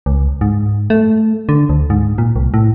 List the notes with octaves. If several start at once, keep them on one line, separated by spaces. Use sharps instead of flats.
C#2
G#2
A3
D3
D2
G#2
A#2
C2
A2